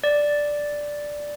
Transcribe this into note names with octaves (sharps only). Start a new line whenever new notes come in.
D5